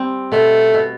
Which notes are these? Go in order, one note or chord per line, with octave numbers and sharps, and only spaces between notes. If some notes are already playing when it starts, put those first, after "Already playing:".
Already playing: G3 C4
B2 A3
B2